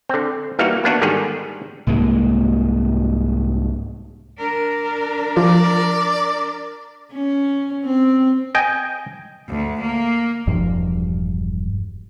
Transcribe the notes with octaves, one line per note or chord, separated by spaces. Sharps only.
D3 C4
E3 G3 A#3 D#4 F#4
A#3 B3 D4 F#4
G#2 D3 D#3 G3 G#4
C2 G#2 G#3 A#3
D4 A#4
F3 D5
C#4
C4
D#5 G5 G#5
D2
A#3
E1 G2 F3